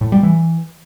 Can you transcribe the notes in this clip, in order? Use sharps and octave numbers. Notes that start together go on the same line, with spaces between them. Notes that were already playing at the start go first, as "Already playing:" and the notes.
A2
G3
E3